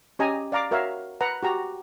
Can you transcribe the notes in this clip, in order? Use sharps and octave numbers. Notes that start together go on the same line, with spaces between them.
C#4 G4 D#5 G#5 A#5
D5 F5 A#5 D6
F#4 A#4 C#5 E5 F5
B4 F#5 A#5
F#4 G4 A#5